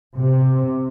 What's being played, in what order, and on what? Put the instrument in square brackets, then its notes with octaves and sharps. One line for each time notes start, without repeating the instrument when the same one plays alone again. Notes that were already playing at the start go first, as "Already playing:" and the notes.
[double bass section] C3